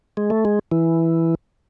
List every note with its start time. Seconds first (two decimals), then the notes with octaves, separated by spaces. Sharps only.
0.17 G#3
0.30 A3
0.45 G#3
0.72 E3